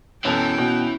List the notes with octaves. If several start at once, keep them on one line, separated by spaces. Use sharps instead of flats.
F#2 B2 E3 C#4 A4 G5
B2